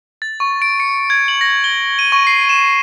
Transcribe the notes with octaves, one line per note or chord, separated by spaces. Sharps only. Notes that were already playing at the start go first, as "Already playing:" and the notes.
A6
C#6
D7
C#7
G#6
F#7
A#6
G7
D#7
C#6
C7
E7